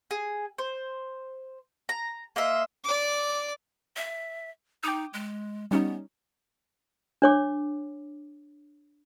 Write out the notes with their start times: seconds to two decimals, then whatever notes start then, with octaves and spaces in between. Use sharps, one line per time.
0.11 G#4
0.58 C5
1.89 A#5
2.36 A#3 D#5 E5 C6
2.84 D5 D6
3.97 E5
4.83 D#4 G5 D6 D#6
5.14 G#3
5.71 G3 B3 C#4 D#4
7.22 D4 C#5 D6